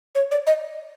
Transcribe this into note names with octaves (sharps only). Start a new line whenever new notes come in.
C#5
D5
D#5